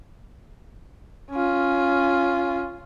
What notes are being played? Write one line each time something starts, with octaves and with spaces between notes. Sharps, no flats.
C#4 F4